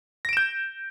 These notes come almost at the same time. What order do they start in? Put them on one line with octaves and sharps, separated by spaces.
A#6 D7 E7 G6